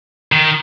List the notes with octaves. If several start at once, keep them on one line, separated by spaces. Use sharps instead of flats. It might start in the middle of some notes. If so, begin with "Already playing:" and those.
D#3